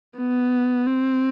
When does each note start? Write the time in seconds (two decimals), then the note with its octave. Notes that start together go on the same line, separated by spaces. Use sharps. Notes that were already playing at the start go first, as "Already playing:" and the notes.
0.18 B3
0.87 C4